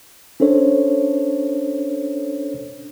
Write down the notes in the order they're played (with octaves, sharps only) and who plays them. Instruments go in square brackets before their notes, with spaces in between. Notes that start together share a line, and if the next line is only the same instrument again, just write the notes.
[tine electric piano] C#4 D4 A4 C5 C#5